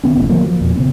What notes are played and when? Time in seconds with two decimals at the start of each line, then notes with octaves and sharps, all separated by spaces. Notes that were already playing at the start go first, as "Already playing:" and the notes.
0.03 D3 B3 C#4
0.15 F1 A2
0.30 D3 F3 F#3 A#3
0.44 F3
0.61 E2 A#2
0.76 C#3 B3 C4